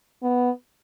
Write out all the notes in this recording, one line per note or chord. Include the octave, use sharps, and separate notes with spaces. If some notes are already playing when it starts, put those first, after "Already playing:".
B3